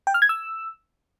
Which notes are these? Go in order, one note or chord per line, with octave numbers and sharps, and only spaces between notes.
G5
F6
G#6
E6